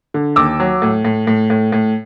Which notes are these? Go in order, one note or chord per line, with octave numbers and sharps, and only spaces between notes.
D3
D#2 D6 E6
F#3
A2
A2
A2
A2
A2